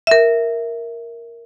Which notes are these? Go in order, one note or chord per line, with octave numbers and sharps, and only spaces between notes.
A#4 E5